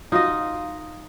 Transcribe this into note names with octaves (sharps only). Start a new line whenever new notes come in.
D#4 F4 F#4 D#5 F5